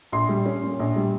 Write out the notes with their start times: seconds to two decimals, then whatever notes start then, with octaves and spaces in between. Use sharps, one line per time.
0.12 A#1 C6
0.29 G3
0.46 C#4
0.63 A#2
0.79 A#1
0.96 G3